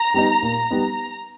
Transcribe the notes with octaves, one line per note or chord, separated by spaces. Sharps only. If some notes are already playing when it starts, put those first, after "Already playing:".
Already playing: A#5
G3 B3 D#4
A#2
G3 B3 D#4